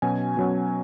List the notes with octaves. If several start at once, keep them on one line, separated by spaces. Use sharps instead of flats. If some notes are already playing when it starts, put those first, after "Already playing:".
B2 F#3 C#4 G#5
B2 F#3 C#4